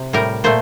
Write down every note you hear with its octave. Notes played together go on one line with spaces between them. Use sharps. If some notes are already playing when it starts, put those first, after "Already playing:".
Already playing: C3
A2 G3 A#4
A#2 A3 C5